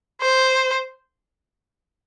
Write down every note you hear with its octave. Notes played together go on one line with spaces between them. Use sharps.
C5